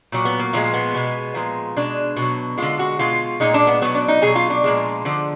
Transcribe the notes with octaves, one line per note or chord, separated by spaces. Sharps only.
A#2 F#3
B3
A#3
A#2 F3 G#3 F4
B3
B2 G#3
A#2 F3 G#3
B2 G#3 D4
B2
F#3
D3 G#3 F4
F#4
B2 G#3 F4
A#2 G#3 D#4
D4
B3
B2 F#3 B3
D4
D#4
B2 F#3 G#4
F4
D4
A#2 F3 G#3
D3 F3 G#3